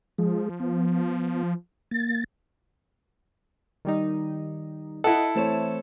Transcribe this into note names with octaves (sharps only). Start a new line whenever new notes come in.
F3 G#3 G#4
B3
A#3 A6
D#3 G3 D#4
E4 A4 D#5 F#5
E3 A3 C4 C#5 A5 E7